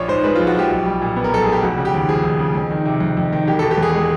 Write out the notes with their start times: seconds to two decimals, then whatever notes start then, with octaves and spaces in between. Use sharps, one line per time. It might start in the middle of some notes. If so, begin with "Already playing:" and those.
Already playing: A#1 F3 C#5 D5
0.08 G#2 C5
0.24 G#3 B4
0.35 A#1 F4
0.47 F#4
0.55 F3 G4
0.70 B1
0.85 G3
1.01 A#2
1.16 B3
1.24 A#4
1.32 B1 A4
1.44 G3 G#4
1.52 G4
1.62 F1 F#4
1.78 C#3
1.85 G4
1.94 D#2
2.09 F3 G#4
2.23 F1
2.39 C#3
2.55 F2
2.70 D#3
2.86 C3
3.00 F2
3.17 F2
3.33 D#3
3.47 E1 G4
3.59 B2 A4
3.71 G4
3.78 E2 G#4
3.94 G#3